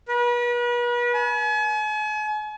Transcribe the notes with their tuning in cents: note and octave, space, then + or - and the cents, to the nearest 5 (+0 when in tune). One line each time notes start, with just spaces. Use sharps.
B4 -40
G#5 +40